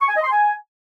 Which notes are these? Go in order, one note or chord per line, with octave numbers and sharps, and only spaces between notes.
C#6
G#5
D#5
C6
G#5